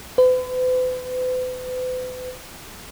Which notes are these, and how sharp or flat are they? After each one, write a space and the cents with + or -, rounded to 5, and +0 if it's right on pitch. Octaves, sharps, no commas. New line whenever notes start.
B4 +45